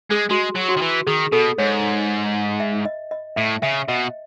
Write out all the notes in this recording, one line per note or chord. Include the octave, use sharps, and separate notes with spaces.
G#3 G#4
G#3 F#4
F#3
F#4
D#3
E3
D#3 G#4
B2 A4
G#2 C#5
E5
D#5
D#5
A2 E5
C#3 E5
B2 D#5